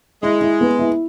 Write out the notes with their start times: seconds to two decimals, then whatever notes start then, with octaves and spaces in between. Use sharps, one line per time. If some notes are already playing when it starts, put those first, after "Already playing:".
0.23 G#3 E4
0.42 E4
0.61 B3
0.79 E4